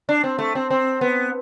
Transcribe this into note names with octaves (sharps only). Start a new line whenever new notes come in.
D4
C4
A3
C4
C4
B3